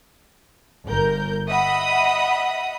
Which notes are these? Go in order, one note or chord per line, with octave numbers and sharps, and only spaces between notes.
G1 A#4 G6
D#5 E5 F#5 B5 D#6